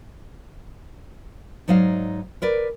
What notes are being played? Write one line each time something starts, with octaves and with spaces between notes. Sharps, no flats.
G#2 F#3 D#4 D5 F5
A#4 B4 D5